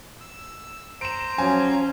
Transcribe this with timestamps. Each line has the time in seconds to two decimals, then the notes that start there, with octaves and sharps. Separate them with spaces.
0.21 E6
1.01 C5 A#5 D7 E7
1.38 F3 F#3 C#4 G#5